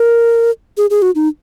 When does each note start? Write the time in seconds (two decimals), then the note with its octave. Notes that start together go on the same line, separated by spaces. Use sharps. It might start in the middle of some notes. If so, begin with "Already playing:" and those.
Already playing: A#4
0.77 G#4
0.90 G#4
1.02 F#4
1.15 D#4